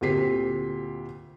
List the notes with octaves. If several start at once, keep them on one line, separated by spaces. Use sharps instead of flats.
D2 A#2 C4 G4 B6 C7